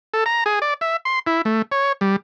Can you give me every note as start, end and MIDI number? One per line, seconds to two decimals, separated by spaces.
0.14 0.24 69
0.26 0.44 82
0.46 0.59 68
0.62 0.74 74
0.81 0.97 76
1.05 1.19 84
1.27 1.42 64
1.45 1.62 57
1.72 1.92 73
2.01 2.16 55